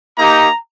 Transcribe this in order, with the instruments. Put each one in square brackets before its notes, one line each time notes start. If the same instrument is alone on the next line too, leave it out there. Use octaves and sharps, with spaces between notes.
[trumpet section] A#3 D#4 G4 A#5